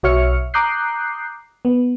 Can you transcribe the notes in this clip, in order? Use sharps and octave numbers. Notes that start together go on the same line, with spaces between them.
B1 F#4 C#5 E5 F6 C#7
A#5 D6 D#6 F#6 G6 C7
B3